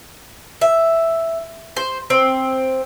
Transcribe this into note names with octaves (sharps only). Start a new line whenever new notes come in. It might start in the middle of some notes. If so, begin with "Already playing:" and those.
E5
C5
C4